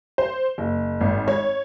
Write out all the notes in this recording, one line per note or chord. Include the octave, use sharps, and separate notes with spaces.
C5
F#1
G#1
C#5